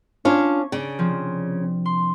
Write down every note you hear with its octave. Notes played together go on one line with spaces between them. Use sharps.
C#4 D4 F4 C#6 G#6
C#3 D4 D5
C3 F3 C4
C6